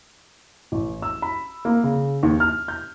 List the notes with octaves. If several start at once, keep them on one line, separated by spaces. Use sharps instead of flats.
A1
E6
B5
A#3
C#3
D#2
F6
G6